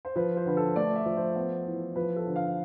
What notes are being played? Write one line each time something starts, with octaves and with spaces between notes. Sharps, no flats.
C5
F3 B4
C5
D3 B4
A4
A3 D5
E5
F3
C5
B3
E3
F3 B4
A4
D3
F5